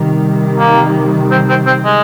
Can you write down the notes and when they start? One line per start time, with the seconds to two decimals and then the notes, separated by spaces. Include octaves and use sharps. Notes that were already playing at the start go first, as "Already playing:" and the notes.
Already playing: C3 D#3 G3
0.59 A#3
1.31 C4
1.49 C4
1.66 C4
1.85 G#3